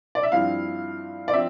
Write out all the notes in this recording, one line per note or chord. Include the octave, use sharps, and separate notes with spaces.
D5
E5
G2 F3 C4 E4 F5
D5
F3 C4 E5